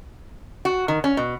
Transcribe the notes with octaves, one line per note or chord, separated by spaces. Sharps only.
F#4
D#3
C#4
B2